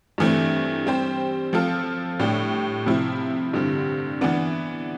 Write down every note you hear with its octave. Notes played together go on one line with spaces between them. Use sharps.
G2 E3 A3 C4
G3 C4 G4 C5
F3 C4 F4 A4
A2 G3 D4 G4
C3 F3 C4 E4
G2 D3 G3 C4
E3 B3 D4